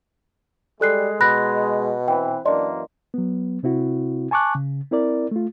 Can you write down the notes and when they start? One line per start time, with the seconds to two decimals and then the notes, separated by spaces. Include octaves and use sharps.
0.81 G3 G#3 A4 F#6 C7
1.21 B2 B5 F#6 A#6
2.08 E3 C4 B4 G5
2.45 F#2 E3 A#3 D4 D5 D#5 C6
3.14 F#3 B3
3.63 C3 C4 E4 F#4
4.31 G#5 A5 C#6 D6 F#6
4.55 C#3
4.92 C4 E4 A#4 D5
5.31 A3 F4